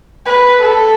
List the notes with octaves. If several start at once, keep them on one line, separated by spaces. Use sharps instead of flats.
B4
A4